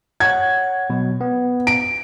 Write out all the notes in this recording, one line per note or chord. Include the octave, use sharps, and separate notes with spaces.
C#5 F#5 G#6
B2 F#3
B3
D7